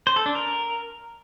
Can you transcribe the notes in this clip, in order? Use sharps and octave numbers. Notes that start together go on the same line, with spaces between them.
C5
A4
D4
A#4